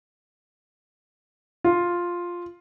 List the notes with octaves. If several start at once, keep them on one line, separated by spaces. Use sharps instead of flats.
F4